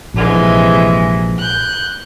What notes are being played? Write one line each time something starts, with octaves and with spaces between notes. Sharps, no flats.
A#1 C3 E3 G#3
F#6 G6